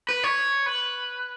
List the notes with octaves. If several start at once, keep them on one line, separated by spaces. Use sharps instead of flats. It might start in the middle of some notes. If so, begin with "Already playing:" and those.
B4
C#5
B4